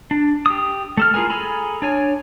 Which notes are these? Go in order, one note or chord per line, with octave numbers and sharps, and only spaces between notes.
D4
G4 D#6
A3 A4 F6
E4 F4 G#4 A#4 G#5
G#4 A4 G#5 A#5 B5
D4 C#5 G#5